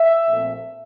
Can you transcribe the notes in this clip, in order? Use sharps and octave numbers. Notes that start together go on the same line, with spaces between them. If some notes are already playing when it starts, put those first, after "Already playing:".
Already playing: E5
A#1 A#2 A3 C4